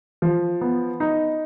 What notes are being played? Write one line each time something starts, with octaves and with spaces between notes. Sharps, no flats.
F3
B3
D#4